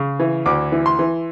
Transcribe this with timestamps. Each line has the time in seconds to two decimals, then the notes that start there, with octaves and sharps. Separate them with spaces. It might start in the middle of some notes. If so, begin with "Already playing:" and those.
Already playing: C#3
0.20 E3
0.46 D2 D6
0.72 E3
0.86 C6
0.99 E3